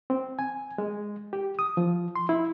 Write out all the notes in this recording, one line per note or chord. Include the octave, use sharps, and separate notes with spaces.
C4
G#5
G#3
G4
D#6
F3
C6
E4